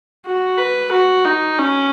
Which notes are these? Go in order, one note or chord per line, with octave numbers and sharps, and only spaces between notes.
F#4
B4
F#4
D#4
C#4